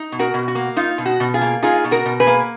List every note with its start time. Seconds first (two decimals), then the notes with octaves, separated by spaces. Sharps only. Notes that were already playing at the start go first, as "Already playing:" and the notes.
Already playing: D#4
0.12 B2
0.19 F#4 A#4
0.34 B2
0.48 F#4
0.55 A#3
0.77 D#4 F4
0.98 B2
1.06 F#4
1.20 B2
1.34 F4 G#4
1.41 A#3
1.63 D#4 F4 G#4
1.84 B2
1.91 F#4 A#4
2.06 B2
2.20 G#4 B4
2.27 A#3